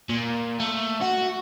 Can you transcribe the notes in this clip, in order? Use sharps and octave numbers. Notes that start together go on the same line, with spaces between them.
A#2
A3
F#4